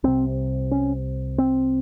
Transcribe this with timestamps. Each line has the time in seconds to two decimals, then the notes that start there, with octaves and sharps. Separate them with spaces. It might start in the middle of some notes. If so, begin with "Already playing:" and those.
0.03 C2 C3 C4
0.71 C#4
1.38 C4